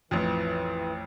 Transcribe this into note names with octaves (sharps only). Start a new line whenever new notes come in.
A1 F2 E3